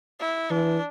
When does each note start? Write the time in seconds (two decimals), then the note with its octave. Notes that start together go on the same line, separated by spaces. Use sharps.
0.20 E4
0.50 E3 D4